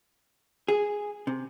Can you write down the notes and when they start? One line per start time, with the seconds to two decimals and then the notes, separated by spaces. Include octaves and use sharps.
0.68 G#4
1.27 C3